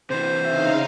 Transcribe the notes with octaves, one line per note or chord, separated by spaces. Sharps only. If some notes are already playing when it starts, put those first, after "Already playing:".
C3 E3 C5
C#3 D#4 E5 F5